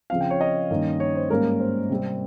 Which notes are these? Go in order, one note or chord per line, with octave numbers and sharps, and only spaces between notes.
C#3 F3 C4 F5
G5
C#5
D#5
G2 D#3 A#3 C#4
C#5
C5
G#2 G3 A#3 C#4 A#4
C5
C3 G3 C4